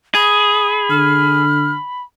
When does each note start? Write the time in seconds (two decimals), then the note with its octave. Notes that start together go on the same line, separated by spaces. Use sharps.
0.15 G#4 B5 D#6
0.90 D3 F6